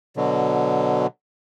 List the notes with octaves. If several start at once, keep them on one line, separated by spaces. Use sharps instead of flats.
B2 D3 F#3